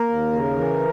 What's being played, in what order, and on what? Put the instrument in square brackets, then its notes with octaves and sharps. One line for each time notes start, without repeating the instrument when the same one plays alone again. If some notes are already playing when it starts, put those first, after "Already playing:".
Already playing: [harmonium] A#3 A#4
D#2
C#3
E3